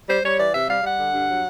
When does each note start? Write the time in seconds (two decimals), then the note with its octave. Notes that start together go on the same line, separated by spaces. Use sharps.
0.09 G3 C5
0.24 G3 C#5
0.38 E3 D5
0.53 C3 E5
0.69 G3 F5
0.83 G3 F#5
0.99 D3
1.13 G2
1.29 F#3